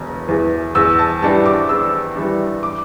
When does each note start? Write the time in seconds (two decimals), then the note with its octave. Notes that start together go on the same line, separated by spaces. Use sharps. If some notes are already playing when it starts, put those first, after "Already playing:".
Already playing: E1 E2
0.28 E2 E3
0.75 E2 E6
0.99 A5
1.22 E3 G3 D4 A5
1.46 D6
1.69 E2 E6
2.16 E3 G3 D4
2.63 D6